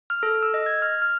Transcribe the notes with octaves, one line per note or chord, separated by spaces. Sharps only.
F6
A4
E6
D#5
G#6
F6
F6